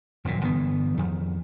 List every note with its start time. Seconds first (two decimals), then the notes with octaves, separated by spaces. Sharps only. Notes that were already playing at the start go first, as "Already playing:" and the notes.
0.25 D#1 F#2 A#2
0.41 G1 E3 B3
0.97 F2 D#3